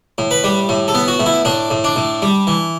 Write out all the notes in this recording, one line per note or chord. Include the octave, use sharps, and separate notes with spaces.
A2
B4
G3
A2
A4
B3
F#4
A2
E4
A2 D4
A2
D4
A2
G3
E3